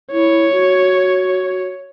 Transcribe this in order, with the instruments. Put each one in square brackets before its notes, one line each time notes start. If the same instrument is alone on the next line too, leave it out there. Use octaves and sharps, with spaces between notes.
[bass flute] E4 [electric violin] C#5
[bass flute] F#4